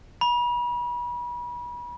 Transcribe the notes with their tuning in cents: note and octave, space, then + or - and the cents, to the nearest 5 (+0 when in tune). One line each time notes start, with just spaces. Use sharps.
B5 -35